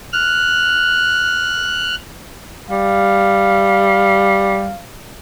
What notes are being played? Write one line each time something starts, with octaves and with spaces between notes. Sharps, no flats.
F6 F#6
G3 F5